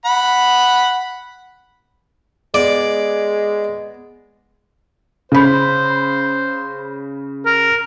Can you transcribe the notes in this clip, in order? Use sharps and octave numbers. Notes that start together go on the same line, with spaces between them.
F#5 B5
G#3 B3 D5
C#3 C5 B5
A#4